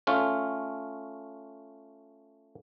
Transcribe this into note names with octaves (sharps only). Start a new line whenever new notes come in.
A3 C#4 F4